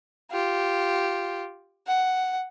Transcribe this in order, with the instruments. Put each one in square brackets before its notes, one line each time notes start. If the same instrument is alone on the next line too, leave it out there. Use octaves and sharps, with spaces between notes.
[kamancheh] F4 G4
F#5